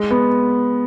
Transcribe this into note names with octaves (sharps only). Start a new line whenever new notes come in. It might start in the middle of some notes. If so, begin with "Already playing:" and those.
Already playing: G#3
B3